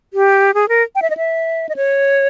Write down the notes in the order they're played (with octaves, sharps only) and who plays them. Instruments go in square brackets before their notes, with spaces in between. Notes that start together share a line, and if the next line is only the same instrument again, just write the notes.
[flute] G4
G#4
A#4
G5
E5
D#5
E5
D#5
C#5